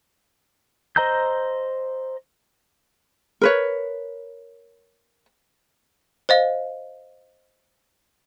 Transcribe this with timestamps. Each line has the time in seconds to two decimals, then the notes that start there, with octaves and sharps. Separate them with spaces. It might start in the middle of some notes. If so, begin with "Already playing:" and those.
0.96 C5 D#5 A#5 E6 G6
3.41 A#4 B4 C#5
6.29 C5 D#5 F5